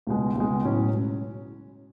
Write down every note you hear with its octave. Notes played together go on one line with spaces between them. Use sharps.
C#2 B2 G#3
C#2 B2 G#3
A2 F#3 C#4